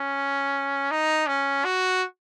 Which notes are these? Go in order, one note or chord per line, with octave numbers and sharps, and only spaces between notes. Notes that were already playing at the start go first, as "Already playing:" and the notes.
Already playing: C#4
D#4
C#4
F#4